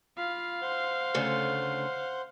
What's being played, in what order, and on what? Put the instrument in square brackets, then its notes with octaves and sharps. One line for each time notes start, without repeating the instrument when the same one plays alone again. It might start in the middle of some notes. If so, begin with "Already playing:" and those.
[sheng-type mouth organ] F4 B5 [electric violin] F5
[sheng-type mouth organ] C5 F#5 C6
[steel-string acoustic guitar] D2 C#3 A3